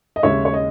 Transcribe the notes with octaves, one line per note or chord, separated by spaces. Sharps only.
D#5
D#2 C#3 G#3 C#5 E5
C#5
D#5